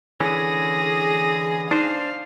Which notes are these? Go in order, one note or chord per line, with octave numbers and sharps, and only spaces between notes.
D3 E3 C#4 G#4 D#6 A#6
D4 D#4 C5 F5